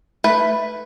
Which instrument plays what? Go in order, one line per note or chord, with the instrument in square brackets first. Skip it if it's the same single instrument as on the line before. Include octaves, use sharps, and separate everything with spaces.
[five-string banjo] A3 B4